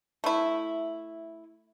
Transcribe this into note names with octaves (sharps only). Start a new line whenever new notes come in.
A3 E4